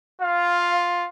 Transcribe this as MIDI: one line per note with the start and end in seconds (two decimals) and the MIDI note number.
0.22 1.07 65
0.22 0.75 77